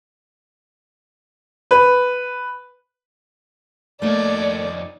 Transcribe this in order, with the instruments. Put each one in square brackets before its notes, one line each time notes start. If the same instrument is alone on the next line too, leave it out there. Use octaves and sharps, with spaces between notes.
[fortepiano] B4
[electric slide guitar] F2 D#4 C#5 [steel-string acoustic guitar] A3 A#3 [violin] D5